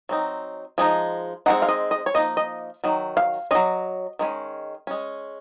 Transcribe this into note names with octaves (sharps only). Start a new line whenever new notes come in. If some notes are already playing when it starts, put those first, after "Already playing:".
F#3 C4 D#4
F3 G#3 D#4
G#3 C4 D#4 F#5
F5
D#5
D#5
C#5
F3 A#3 D#4 D#5
D#5
D#3 F#3
F5
F#3 C#4 D#5
D#3 G#3 C#4
G#3 C#4